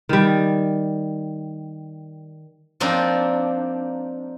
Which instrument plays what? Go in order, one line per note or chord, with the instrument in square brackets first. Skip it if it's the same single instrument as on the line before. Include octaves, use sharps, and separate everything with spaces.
[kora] D#3 G3
[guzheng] F3 A#3 C4 D4 D#4